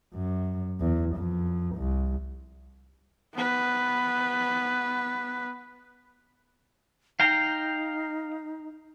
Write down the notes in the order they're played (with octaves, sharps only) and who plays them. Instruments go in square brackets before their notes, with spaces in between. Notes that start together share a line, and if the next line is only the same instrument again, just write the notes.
[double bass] F#2
E2
F2
C2
[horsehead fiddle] B3 B4
[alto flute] D#4 [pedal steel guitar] F5 G5 A#5